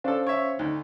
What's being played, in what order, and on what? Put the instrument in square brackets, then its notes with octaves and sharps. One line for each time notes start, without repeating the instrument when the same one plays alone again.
[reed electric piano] C#4 C5 F5 [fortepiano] D4 A4
[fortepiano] C#5 E5
[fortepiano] D2 [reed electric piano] D#4